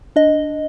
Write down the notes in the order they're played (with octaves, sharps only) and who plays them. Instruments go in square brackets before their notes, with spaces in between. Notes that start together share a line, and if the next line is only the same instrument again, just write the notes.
[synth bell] D4 D#5